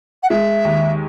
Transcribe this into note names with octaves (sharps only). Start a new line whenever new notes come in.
F#5
G#3 E5
D#2